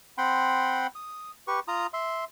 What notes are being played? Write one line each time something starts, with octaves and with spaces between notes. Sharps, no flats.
C4 F#5 G5 B5 C6
D#6
G4 B4 C#6
F4 A#5 D#6
E5 C6